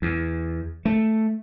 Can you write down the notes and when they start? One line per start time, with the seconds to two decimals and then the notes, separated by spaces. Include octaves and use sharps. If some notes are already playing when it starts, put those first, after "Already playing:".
0.02 E2
0.85 A3